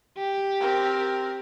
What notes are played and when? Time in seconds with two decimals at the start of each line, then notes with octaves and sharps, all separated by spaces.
0.18 G4
0.60 C4 A#4